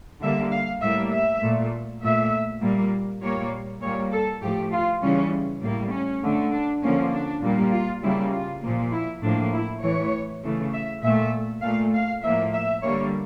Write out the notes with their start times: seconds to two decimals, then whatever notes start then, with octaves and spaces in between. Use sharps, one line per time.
0.21 D3 G3 A#3 E5
0.51 F5
0.81 A2 G3 A#3 E5
1.12 E5
1.42 A#2 A3
2.02 A#2 A3 E5
2.61 A#2 G3 A#3
3.22 A#2 G3 A#3 C#5
3.81 A#2 G3 A#3 C#5
4.12 A4
4.42 A2 F3 A3 G4
4.72 F4
5.02 C#3 E3 G3 C#4
5.62 A2 G3 A#3
5.92 C#4
6.23 D3 A3
6.53 D4
6.83 D3 F3 A#3 C#4
7.12 D4
7.42 A#2 G3 A#3
7.72 F4
8.03 C#3 G3 A#3 E4
8.33 F4
8.62 A#2 F3 A#3
8.92 E4
9.22 A2 F3 A#3 D4
9.52 E4
9.83 A2 E3 A3 C#5
10.43 C#3 E3 A3
10.73 E5
11.03 A#2 A3 E5
11.62 A#2 A3 F5
11.93 F5
12.22 A2 F3 A#3 E5
12.53 E5
12.83 D3 G3 A#3 C#5